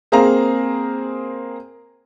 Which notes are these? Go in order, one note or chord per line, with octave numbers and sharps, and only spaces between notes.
A#3 C4 G#4 F5 A#5